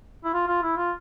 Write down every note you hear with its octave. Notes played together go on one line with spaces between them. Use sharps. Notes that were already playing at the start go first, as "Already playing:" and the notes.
E4
F4
F4
E4
F4